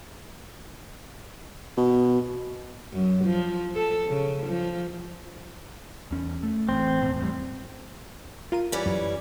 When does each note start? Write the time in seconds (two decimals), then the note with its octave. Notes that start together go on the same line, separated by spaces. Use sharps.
1.77 B2
2.93 F#2
3.25 F3
3.75 A4
4.07 C#3
4.47 F3
6.11 E2 C#4
6.43 A3
6.69 A1 A2 C4
7.02 E1 D#2 A2
7.19 E2 A2 G3
8.52 F4 A#4 D#7
8.72 E3 G3 C#4
8.86 F#2